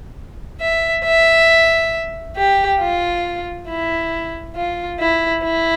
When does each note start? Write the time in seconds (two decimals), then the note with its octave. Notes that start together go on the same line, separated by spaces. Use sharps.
0.61 E5
1.05 E5
2.36 G4
2.80 F4
3.68 E4
4.56 F4
4.99 E4
5.43 E4